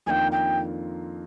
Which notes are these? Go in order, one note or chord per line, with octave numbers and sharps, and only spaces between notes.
F2 D#3 A#3 D4 F4 G5 G#5
G5